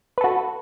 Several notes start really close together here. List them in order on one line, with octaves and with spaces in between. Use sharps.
B4 A4 F#4